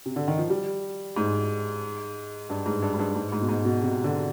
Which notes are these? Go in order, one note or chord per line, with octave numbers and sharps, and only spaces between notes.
C3
D3
D#3
F3
G3
G#2
G2
G#2
G2
G#2
G2
G#2
G#2
B2
G#2
B2
C3
D3